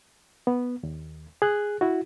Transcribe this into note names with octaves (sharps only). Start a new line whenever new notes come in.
B3
D#2
G#4 F#6
E4 F#4